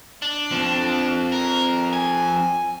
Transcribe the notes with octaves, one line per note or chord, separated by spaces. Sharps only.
D4
F3 C4
A#4
G#5